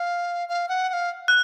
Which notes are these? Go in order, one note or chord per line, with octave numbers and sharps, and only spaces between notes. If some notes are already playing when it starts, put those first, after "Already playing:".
Already playing: F5
F5
F#5
F#5
F5
F#6